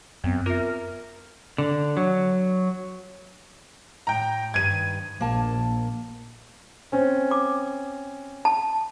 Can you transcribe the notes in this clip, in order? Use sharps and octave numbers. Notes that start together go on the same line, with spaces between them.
F#2 B3 C4
F4 A#4 E5
D3
F#3
A2 G5 A#5
G2 D#3 G#6 D#7
A#1 A#3 A5
C4 C#4
D6
A5